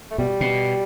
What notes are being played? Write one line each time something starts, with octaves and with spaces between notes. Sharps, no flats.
A3
B2 G3
B2